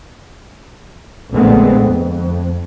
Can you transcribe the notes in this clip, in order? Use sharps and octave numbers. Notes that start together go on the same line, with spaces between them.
A#1 D3 G#3 A3 B3 C4
F2